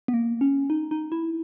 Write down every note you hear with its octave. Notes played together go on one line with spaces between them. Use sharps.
B3
A#3
C#4
D#4
D#4
E4